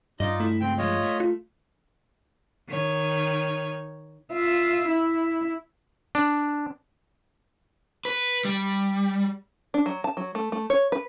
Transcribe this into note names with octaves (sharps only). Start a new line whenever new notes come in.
G2 D#4 F4 D5 D#5
A3 E4
C#2 C4 G5
F3 G#3 F4 C#5 D#5
A3
F4
D#3 C#5
F4 E5
E4
D4
B4
G3
D4
F#3
A5
F#3
A3
A3
C#5
B4